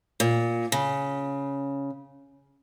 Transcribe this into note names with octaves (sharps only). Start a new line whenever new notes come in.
A#2
C#3